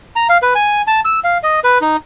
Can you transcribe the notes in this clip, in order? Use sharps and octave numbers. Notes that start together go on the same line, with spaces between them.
A#5
F5
B4
G#5
A5
E6
F5
D#5
B4
D#4